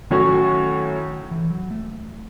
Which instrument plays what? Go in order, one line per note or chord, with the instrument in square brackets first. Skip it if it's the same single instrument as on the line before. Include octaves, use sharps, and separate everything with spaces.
[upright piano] A2 F#3 C#4 F#4 C#5 [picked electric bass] D#3
[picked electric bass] E3
F#3
A3